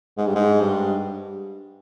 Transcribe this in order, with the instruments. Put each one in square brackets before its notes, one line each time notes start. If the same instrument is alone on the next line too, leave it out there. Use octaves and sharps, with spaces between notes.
[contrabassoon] G#2
G2
G#2
G2